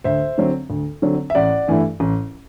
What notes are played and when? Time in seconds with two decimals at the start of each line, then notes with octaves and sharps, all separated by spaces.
0.04 D2 C5 E5
0.38 D3 F#3 C4
0.70 D2
1.02 D3 F#3 C4
1.30 E5
1.35 A1 D5 F#5
1.68 G2 E3 A3 E4
2.00 A1